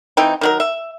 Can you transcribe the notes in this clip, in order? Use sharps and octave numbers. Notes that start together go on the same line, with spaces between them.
E3 C4 D#4 G5
D#3 F#3 A#4
E5